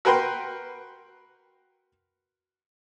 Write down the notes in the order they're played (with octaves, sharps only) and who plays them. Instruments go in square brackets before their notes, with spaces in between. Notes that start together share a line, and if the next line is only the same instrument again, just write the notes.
[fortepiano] F#4 A#4 B4 G5 C6